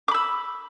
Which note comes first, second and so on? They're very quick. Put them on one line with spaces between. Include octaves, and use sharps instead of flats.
D6 B5 E6